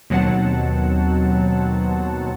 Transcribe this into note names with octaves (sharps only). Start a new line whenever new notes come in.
D#2 B2 F#3 C4 F#5 A5